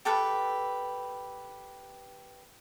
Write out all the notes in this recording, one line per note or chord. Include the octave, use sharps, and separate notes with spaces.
G4 A4 B4